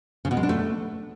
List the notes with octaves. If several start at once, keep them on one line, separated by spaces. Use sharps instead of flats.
C#3
B2
G#3
D4
A3